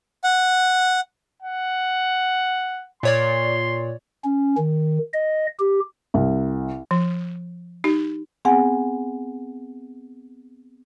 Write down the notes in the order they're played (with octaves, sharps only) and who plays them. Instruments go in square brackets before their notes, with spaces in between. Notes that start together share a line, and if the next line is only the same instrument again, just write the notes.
[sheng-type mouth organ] F#5
[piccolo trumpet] F#5
[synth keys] A#2 C#5 D5 [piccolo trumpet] C6
[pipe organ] C#4
D#3
D#5
G4
[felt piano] C2
[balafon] F3
D#4 G4
[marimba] B3 C4 G#4 F#5 G#5